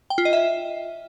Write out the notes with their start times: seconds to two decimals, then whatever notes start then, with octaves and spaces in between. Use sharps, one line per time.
0.10 G5
0.18 F4
0.25 D#5
0.33 E5